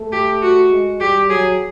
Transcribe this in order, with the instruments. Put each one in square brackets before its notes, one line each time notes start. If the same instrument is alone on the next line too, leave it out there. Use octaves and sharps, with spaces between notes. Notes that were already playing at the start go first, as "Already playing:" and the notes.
Already playing: [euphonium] A3
[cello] G4
F#4
[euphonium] G#3
[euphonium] G3 [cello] G4
[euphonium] F#3 [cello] G#4